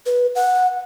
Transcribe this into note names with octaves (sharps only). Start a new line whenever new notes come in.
B4
F#5